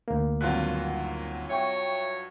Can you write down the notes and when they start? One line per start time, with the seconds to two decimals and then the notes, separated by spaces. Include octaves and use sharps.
0.08 D2 A#3
0.41 G#1 G2 F#3 F4 F#5 F#6
1.50 C#5 E5 G5 C#6